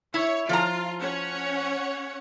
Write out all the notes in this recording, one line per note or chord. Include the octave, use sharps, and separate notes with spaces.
E4 C#5
F3 F4 A#5
C#4 C#5 F#5